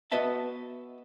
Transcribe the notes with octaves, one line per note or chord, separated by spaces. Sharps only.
B3 F#4 B4 D#5 E5 A5